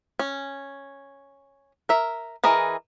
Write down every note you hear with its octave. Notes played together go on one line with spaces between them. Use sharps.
C#4
A#4 E5
E3 G#4 A#4 D#5